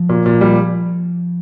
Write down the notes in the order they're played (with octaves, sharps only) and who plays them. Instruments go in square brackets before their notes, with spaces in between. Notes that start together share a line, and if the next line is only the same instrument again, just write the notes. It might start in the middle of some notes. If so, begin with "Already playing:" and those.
Already playing: [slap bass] F3
[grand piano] A#2
A#2
G3